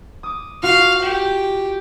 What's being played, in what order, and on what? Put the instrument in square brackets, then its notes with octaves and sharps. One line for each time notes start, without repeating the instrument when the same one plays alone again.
[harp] D6 D#6
[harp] F4 F#4 [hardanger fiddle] F5
[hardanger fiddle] G4